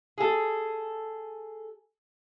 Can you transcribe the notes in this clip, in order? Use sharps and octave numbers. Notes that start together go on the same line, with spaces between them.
G#4 A4